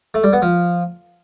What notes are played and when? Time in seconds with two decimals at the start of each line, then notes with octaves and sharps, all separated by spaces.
0.14 A3
0.24 G3
0.33 B3
0.42 F3